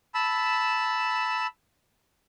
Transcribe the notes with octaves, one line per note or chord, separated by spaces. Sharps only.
A5 B5 E6